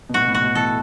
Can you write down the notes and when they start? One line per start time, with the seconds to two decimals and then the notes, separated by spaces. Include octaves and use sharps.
0.09 B2
0.14 A2 F#4
0.21 B2
0.28 A2
0.34 F#4
0.42 B2
0.55 B2 E3 A4